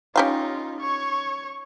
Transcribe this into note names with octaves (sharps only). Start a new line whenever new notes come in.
C#4 D#4 F4 G4 F5
C#5 C#6